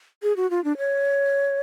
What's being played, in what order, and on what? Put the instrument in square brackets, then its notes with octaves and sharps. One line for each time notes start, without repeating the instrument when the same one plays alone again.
[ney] G#4
F#4
F4
D4
C#5